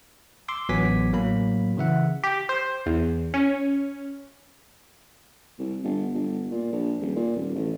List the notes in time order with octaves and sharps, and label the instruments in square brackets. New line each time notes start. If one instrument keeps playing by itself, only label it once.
[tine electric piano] C6 D6 E6
A1 F#3 B3 G#5 D6 B6
A2 F#3 A#3 B5
C#3 E3 E5 F#5
[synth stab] G4
C5
E2
C#4
[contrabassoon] C2
G1
G1
A#2
A#1
D#1
A#2
D#1
A1